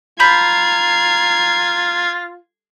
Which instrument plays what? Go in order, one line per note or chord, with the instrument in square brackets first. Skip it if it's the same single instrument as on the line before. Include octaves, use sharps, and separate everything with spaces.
[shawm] F4 [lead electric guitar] A#5 [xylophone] B5 G6 B6 [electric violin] G#6 C7